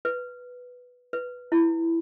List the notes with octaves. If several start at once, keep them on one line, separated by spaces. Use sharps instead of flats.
B4
B4
E4